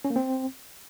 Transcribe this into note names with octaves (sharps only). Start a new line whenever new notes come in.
C#4
A#3
C4